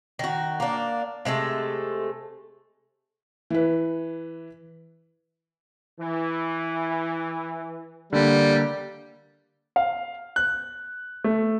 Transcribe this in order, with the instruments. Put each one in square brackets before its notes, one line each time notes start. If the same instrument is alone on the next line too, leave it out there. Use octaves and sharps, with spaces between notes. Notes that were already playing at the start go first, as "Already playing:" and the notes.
[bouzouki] D#3 F#4
A#3 D4
C3 G#3 A3 A4
[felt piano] E3 B4
[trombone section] E3
[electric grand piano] D3 A#3 [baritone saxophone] G3
[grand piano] F5
F#6
A3